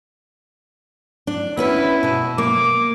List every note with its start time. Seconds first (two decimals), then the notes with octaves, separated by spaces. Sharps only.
1.27 D4
1.57 B3 C#4 E4 B4
2.03 B2 D#5
2.38 A#3 D6